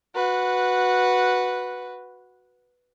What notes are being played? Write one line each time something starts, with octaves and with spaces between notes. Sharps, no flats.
F#4 B4